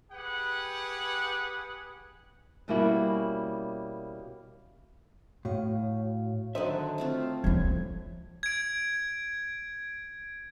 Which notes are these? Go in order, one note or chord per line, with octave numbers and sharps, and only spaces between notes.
G4 G#4 B4 F#5
B2 G3 A#3 C#4 E4 F#4
A2 F#4 C#5 F5
D3 D#3 F#3 C5 D#5 E5
A3 C4 F4
F3 F#3 G#6
G#6 D7